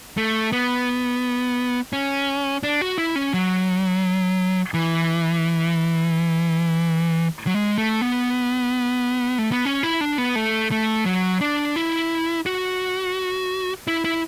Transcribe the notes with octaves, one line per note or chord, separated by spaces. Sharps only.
A3
B3
C#4
D4
F#4
E4
C#4
F#3
E3
F#3
G#3
A3
B3
A3
B3
C#4
E4
D4
B3
A3
A3
F#3
D4
E4
F#4
E4
E4